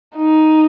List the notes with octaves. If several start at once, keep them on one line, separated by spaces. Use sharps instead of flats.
D#4